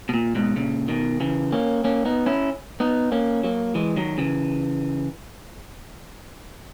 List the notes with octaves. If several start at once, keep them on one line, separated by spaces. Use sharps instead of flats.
B2
A#2
G#2 B2
A#2 C#3
B2 D#3
C#3 E3
A#3 C#4
A#3 C#4
B3 D#4
C#4 E4
B3 D#4
A#3 C#4
F#3 A#3
E3 G#3
D#3 F#3
C#3 E3